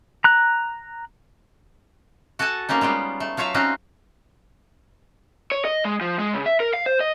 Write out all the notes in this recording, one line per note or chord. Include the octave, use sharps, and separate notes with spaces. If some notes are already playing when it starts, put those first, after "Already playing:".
A#5 F#6
F#4 A4 F#5 G#5 A5
A#3 C4 C#4 D#4
G3 G#3 B3 F4
A3
F#3 F4 C#5 E5 F5
C4 C#4 D#4 F4 F#4
C#5
D#5
G#3
F3
G#3
C#3
E5
A#4
F5
C5
D#5